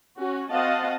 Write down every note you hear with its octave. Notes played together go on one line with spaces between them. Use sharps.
C#4 F#4
C4 F#4 D#5 F5 F#5 A5